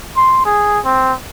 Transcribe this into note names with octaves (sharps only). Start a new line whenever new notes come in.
C6
G#4
C4